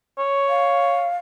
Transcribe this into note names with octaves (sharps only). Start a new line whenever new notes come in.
C#5
F5